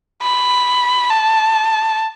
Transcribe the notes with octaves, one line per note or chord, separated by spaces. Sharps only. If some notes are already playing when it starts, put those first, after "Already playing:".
B5
A5